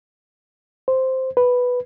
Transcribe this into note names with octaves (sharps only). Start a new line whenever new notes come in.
C5
B4